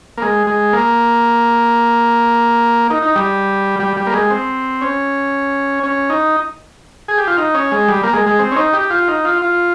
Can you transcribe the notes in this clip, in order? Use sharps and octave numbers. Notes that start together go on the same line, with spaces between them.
A#3
G#3
G#3
A#3
D#4
D#4
G3
G3
G3
A#3
G#3
C4
C#4
C#4
D#4
G#4
G4
F4
D#4
C#4
G#3
G3
A#3
G#3
G#3
C4
C#4
D#4
G4
F4
D#4
F4
F4